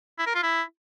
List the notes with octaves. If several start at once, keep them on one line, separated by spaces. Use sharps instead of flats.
E4
A#4
F4
E4